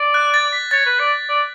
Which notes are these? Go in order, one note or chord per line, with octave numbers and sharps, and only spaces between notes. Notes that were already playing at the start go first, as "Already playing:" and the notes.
Already playing: D5
F#6
A6
B6
C#5 A6
B4
D5
D5